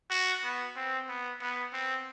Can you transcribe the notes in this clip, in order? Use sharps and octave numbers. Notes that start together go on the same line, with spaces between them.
F#4
B3
C4
B3
B3
C4